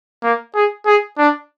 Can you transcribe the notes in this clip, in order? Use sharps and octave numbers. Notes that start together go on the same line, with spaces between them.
A#3
G#4
G#4
D4